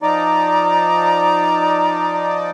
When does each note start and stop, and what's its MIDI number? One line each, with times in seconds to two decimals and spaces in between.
0.02 2.51 53
0.02 2.51 63
0.02 2.51 74
0.02 2.36 82